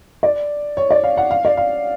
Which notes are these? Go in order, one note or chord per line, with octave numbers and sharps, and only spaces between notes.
D5
C#5
D5
F5
F#5
F5
D5
F5